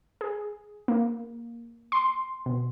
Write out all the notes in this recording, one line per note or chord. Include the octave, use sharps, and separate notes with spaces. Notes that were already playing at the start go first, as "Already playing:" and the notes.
G#4
A#3
C6
B2